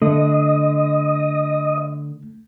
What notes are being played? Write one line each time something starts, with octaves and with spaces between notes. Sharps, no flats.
D3 A3 D#5